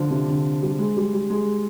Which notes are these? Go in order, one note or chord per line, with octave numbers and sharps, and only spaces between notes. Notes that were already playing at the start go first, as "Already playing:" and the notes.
Already playing: D3 F3
C3
D3
G3
G#3
G3
G3
G#3